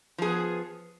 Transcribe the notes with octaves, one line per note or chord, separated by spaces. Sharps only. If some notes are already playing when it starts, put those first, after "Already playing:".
F3 B3 G#4